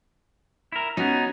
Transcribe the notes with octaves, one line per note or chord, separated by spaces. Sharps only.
E4 A#4
B3 C#4 D#4 F#4